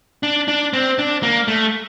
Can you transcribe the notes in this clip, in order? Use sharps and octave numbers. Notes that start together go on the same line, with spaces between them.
D4
D4
C4
D4
A#3
A3